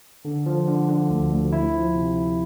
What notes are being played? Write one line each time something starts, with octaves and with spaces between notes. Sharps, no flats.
D3
F3
D3
D3
D2
D2
E4
F3
C3
E4